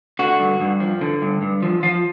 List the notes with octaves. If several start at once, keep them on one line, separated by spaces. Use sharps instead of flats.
D3 F#4
G2
G2
F3
D3
G2
G2
F3
F3 F4